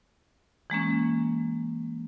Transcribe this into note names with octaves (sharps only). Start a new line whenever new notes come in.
E3 G#3 A#3 C#4